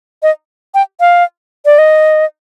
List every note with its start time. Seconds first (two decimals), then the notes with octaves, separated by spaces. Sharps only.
0.23 D#5
0.74 G5
1.00 F5
1.66 D5
1.78 D#5